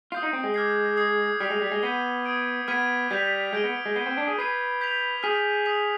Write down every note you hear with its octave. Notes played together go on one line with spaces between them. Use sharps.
F4 D#6 G6 C7
D#4
C4
G#3
D6 F6 G#6 C7
D#6 G#6 C7
G3 F6 C7 F7
G#3
G3
G#3
B3 G6 B6 D#7 G7
D#6 G#6 D7
B3 F6 G#6 B6 D#7
G3 G6 B6 F7
G#3 G6 D7 G7
B3
G#3
B3 G6 C7 D#7 G7
C4
D4
G#4
B4 G#6 C7 D#7
G6 B6 F7
G#4 F6 B6 F7
D#6 B6 F7